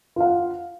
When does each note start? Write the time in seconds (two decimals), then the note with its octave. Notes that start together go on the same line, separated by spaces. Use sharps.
0.16 F4
0.20 F5
0.25 F#5